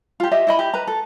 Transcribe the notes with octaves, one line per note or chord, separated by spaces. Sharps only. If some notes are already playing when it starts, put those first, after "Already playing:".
F4 G4
G4 D#5 E5
E4 D#5 B5
G4
B4 A#5
A4